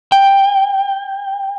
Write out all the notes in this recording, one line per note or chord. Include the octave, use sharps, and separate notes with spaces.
G5